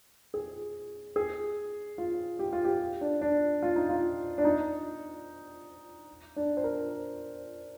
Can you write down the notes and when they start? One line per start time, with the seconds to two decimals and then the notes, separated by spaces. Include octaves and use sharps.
0.34 G#4
1.16 G#4
1.98 F4
2.39 G4
2.53 F4
2.65 G4
3.01 D4
3.21 D4
3.62 F4
3.76 D#4
3.89 F4
4.38 D4
4.45 D#4
6.36 D4
6.57 C5
6.64 A#4